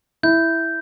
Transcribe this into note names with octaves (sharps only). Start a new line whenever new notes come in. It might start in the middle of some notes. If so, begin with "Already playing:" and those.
E4 G6